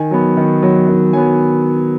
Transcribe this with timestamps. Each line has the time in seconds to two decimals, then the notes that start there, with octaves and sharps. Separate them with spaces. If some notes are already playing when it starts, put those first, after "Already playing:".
Already playing: D#3 G#5
0.11 F#3 B3
0.37 D#3
0.63 F#3 B3
0.88 D#3
1.13 F#3 B3 G#5